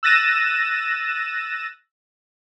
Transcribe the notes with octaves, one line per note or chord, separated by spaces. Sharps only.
E6 F#6 A6 A#6 D#7 E7